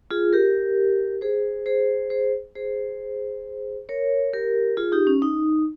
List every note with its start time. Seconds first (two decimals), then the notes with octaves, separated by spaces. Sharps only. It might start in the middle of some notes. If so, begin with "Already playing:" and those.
0.11 F4 G#4
0.33 G4 A#4
1.21 G#4 C5
1.66 G#4 C5
2.10 G#4 C5
2.55 G#4 C5
3.89 A#4 C#5
4.33 G4 A#4
4.77 F4 G#4
4.92 D#4 G4
5.07 C#4
5.22 D#4